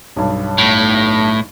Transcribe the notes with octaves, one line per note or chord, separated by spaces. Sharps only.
B1 G2
A2